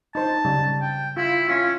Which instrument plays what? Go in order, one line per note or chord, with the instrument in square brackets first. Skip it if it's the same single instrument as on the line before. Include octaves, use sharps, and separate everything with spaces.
[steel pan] D#4 C5 [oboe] A5
[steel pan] C#3 G3
[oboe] G5
[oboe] E4 [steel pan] F4
[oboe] C#4 [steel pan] F4